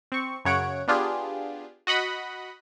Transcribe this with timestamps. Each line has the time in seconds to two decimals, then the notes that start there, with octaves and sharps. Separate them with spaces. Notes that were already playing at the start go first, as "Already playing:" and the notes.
0.12 C4 C#6
0.45 F#2 C#3 C#5 F#5 D7
0.88 B3 D4 F4 G4 G#4
1.87 F#4 D#5 F#5 B5